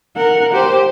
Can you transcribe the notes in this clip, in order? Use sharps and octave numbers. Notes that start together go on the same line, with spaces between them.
A#4 F#5
G4 C5